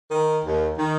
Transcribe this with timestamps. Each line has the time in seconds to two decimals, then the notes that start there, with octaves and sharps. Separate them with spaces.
0.11 D#3
0.44 D#2
0.76 D#3